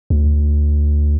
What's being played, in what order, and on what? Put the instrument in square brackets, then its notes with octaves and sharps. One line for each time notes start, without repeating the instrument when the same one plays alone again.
[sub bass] D2